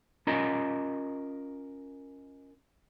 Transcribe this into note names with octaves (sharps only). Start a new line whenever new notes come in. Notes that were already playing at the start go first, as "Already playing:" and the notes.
C#4 F4 A#4 D#5 A#5